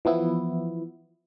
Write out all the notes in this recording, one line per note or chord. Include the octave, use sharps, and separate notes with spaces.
E3 F3 B3 E4